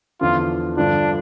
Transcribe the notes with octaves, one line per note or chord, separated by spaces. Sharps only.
E2 D3 F3 F4
G2 D3 F3 D4